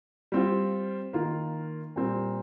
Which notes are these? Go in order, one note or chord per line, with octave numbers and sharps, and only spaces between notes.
G3 C4 F4
D#3 A#3 F4
A#2 G3 C4